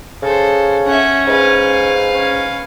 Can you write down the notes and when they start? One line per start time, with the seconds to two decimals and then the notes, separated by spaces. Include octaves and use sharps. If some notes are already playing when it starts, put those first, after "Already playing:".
0.22 C#3 A4 C5
0.86 C#4 E5 F#5
1.27 G#2 B4 F5
2.13 C#4